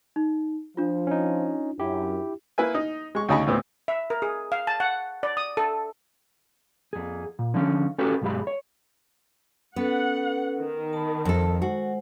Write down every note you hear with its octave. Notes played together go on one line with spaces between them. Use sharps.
D#4
F3 D4 F4
C#4 D#4
F#2 E4 G4
A#3 E4 B4 E5 G#5
D#4
G#3 C#6
D2 C#3 D#4 A5 B5 C#6
D2 A2 B3 C4
E5
A#4
G#4
F5
A5
F#5
D5
D#6
A4
F2 G#4
A#2
D3 F3 C#4
C#4 F#4 G4 A4 B4
B1 G2 G#3 G4 G#4 B5
C#5
B3 C#4 A4 B4 F#5
D#3
A5 B5
F2 A4 A5
G#3 F#4 C5 F#5